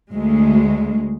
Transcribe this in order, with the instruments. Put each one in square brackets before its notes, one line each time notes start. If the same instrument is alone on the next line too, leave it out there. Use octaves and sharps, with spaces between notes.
[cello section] D2 G#3